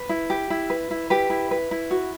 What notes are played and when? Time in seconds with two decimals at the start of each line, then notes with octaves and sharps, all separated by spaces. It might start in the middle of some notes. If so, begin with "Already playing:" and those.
Already playing: B4
0.09 E4
0.30 G4
0.50 E4
0.70 B4
0.91 E4
1.10 G4 B4
1.30 E4
1.51 B4
1.71 E4
1.91 F#4